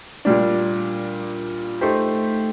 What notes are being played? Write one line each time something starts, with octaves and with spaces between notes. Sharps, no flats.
A#2 G3 D4
A3 D#4 G4 C5